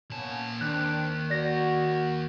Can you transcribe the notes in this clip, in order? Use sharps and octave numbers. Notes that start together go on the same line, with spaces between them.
A#2 A#3 B3 C#4 A5
D#2 C4 D4 F#6
F#4 D5 A#6